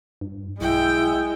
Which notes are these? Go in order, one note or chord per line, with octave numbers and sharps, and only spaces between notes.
G2
B1 G#3 E4 G5